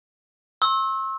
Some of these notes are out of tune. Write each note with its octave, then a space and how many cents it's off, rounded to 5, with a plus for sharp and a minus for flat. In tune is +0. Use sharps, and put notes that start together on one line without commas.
C6 +45 E6 -20